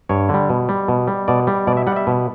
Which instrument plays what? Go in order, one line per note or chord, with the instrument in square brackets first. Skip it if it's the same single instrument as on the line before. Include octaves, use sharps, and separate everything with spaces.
[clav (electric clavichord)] G2 C#5
D3 G3
B2
G3
B2
G3
B2 D5
G3
B2 D5
E5
G3 F#5
E5
B2